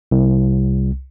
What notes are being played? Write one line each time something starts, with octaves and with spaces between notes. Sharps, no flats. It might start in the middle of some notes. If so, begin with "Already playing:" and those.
C2